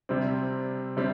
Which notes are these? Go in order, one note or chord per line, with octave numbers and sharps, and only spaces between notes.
C3 G3 C4
C3 G3 C4